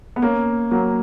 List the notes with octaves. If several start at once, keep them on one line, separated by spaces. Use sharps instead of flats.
B3
A#3 C#4
F#3 A#3